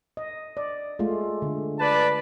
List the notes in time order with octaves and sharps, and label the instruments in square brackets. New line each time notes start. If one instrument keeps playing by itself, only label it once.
[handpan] D#5
D5
G#3 A3 F4
D3
[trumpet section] B4 D5 A5